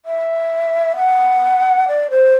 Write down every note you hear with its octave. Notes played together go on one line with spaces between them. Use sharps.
E5
F#5
D5
C5